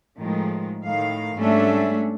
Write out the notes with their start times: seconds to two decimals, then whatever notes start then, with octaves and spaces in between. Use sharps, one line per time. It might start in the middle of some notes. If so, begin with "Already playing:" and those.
0.18 A2 D#3 F3 G#3
0.85 A2 D#3 F5
1.37 G#2 G3 A3 C#4 D4 E5